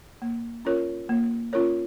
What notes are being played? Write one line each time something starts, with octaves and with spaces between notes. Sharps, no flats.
A#3
C#4 F4 A#4 C#5
A#3
C#4 F4 A#4 C#5